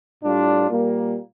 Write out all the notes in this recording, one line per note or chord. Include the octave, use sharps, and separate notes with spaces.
A2 G3 D4 F4
A#2 G3 A#3